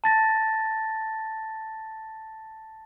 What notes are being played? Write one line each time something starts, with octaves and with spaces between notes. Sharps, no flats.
A5 A6 A#6